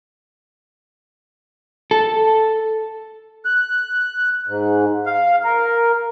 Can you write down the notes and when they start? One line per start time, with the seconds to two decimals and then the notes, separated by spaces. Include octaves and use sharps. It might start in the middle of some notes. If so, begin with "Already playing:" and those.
1.91 A4
3.45 F#6
4.47 G#2
5.06 F5
5.44 A#4